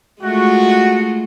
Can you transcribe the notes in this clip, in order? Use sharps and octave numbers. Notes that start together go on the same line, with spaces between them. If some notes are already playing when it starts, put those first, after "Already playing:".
G#3 A3 F4 F#4